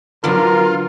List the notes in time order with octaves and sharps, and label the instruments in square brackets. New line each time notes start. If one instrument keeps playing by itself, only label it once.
[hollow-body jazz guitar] D3 F#3 [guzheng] B3 D4 [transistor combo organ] F4 [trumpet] A#4